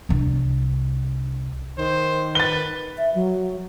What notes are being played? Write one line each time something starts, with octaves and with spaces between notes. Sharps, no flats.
C2 D4
D#3 C5
B4 A6 G7
E5
F#3